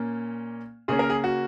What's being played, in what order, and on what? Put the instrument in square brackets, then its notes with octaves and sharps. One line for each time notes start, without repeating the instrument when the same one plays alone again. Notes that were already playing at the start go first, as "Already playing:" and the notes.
Already playing: [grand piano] A#2 A#3 C#4
C#3 A#3 C#4 G#4
A#4
G#4
F#4